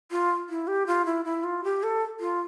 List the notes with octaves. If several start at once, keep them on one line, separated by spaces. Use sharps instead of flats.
F4
E4
G4
F4
E4
E4
F4
G4
A4
F4